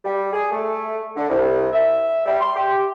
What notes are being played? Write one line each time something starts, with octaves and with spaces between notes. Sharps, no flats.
G3
G#4
A3
D3
C2
E5
G3
C6
G4